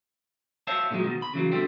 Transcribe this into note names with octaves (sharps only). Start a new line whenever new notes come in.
C5 C#5 E5 F5 A5
A#2 D3 D#3 F#3 G#3
B2 D#3
B5
C#3 E3 F#3 A#3
B2 D3 G3 C4